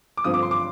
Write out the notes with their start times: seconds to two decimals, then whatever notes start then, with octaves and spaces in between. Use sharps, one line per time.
0.17 D6
0.24 G2 D3 F3 C4 D#6
0.34 D6
0.43 C6
0.51 D6